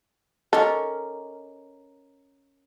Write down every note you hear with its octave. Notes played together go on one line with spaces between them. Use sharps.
C#4 A4 A#4 D#5 D6